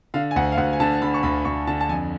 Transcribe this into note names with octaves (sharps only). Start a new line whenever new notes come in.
D3 F5
G#5
D2 F#5
F5
D2 F#5
G#5
D3 A5
D3 B5
C#6
D2 B5
D2 C#6
D3 A5
A5
F2 G#5